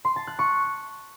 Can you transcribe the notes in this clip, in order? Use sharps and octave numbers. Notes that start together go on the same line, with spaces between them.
C6
A5
F#6
C#6